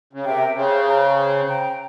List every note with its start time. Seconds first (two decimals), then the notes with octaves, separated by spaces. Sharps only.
0.13 C#3
0.24 C3 A#4 E5 G5
0.55 C#3 C5
0.86 G5 A#5
1.16 C5
1.47 G5 A#5